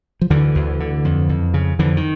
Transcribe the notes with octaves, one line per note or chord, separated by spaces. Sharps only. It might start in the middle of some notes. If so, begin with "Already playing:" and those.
F3
D2 D3 E3
D2
D3
F2
F2
C#3
F2 D3 E3
D#3